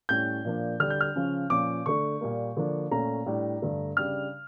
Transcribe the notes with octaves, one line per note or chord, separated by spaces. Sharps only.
A2 G3 C#4 G6
A#2 F3 A#3 D4
D3 G3 D4 F6
G6
F6
C#3 F3 C#4
A#2 F3 C#4 D6
D3 A3 D4 C#6
A#2 G3 A#3
D3 F3 A#3 D4
A#2 A3 C#4 A#5
A2 G3 D4
G2 D3 A3
C#3 G3 D4 F6